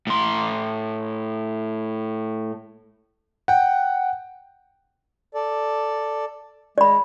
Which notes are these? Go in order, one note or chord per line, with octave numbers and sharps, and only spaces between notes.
A2 C6
F#5 G5
A4 D5
G#3 D5 B5